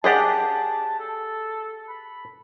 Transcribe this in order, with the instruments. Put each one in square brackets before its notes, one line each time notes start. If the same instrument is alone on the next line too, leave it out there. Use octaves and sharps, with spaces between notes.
[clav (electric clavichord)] D4 G4 D5 [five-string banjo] G#4 D#5 F#5 [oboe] A5
[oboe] A4
B5